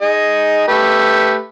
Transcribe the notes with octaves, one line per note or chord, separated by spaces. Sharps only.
D#4 G#4 D#5
A3 G4 B4